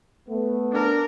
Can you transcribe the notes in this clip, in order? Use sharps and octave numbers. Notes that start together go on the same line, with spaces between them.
A3 B3
D4 A#4